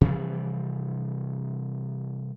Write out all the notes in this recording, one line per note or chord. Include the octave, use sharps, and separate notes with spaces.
C3 E3 F3 G3